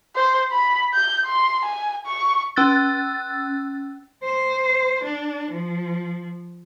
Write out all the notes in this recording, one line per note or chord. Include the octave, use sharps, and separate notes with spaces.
C5
B5
G6
C6
G#5
C#6
C#4 E6 F#6 A6
C5
D4
F3